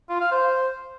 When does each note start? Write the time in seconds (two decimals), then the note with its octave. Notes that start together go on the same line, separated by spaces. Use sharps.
0.10 F4
0.21 F5
0.32 C5